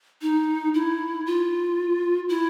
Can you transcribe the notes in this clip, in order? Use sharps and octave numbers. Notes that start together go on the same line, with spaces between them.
D#4
E4
F4
E4